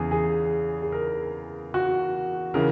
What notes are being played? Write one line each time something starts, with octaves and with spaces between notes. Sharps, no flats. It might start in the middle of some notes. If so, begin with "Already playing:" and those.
Already playing: E2 C#3 G#4
G#4
G#4
A#4
F#4
C#3 E3 A#4